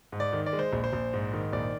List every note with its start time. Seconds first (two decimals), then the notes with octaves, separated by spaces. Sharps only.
0.12 G#2
0.20 D5
0.33 D#3
0.46 D5
0.53 G#3
0.59 C5
0.73 A#1
0.84 C5
0.93 A#1
1.13 G#2
1.33 D#3
1.53 A#1 D5